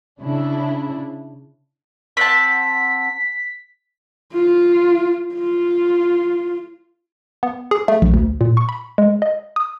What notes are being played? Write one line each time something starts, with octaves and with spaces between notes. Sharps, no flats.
C#3 D4 E4
C4 F#5 A5 B6
F4
F4
B3
G#4
A3
A#1
D2
A#2
C#6
B5
G#3
D#5
D#6